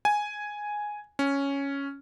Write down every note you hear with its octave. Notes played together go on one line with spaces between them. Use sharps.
G#5
C#4